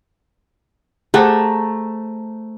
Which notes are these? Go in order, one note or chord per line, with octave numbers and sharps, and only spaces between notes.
A3 G4 G#4 C5 F#5 A5 A#5